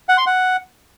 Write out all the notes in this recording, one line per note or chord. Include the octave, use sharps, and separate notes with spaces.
F#5
C6
F#5